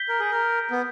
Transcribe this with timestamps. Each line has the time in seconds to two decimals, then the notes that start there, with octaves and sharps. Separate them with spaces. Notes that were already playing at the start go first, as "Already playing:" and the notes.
Already playing: G6 B6 G7
0.09 A#4
0.20 G#4
0.31 A#4
0.71 B3